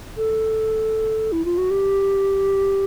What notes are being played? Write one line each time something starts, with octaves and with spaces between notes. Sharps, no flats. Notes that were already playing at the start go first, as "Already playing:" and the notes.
A4
E4
F4
F#4
G4